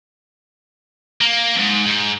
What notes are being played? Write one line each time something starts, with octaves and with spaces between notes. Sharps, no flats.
A#3
F2 G#2
G#2